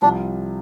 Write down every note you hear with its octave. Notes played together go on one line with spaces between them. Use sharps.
C2 C3 F3 D4